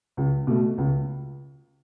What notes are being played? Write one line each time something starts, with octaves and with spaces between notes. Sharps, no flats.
C#2
B2 A3
C#2